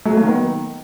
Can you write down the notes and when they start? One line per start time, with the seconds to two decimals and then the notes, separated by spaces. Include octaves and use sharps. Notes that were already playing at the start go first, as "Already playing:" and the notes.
0.06 F#3 A3
0.17 A#3
0.22 D#3
0.28 B3